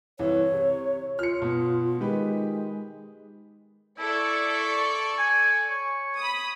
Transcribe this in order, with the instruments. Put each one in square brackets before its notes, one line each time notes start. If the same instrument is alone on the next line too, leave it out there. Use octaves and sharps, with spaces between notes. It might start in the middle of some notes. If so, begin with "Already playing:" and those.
[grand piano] C2 E3 [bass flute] C#5
[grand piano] C3
[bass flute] F4 [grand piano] F6 C#7
[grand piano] B2
[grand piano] D#3 G4 B4 [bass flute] G#3
[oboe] E4 [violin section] A4 D5 C#6
[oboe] G#5
C#5
[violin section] B5 D#6